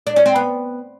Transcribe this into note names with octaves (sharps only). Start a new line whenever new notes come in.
D4
C#4
C4
B3